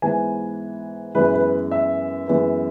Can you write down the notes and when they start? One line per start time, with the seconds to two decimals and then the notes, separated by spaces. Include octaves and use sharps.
0.02 G#2 E3 B3 G#5
1.15 F#2 E3 G#3 B3 B4
1.34 B4
1.71 E5
2.28 F#2 E3 G#3 B3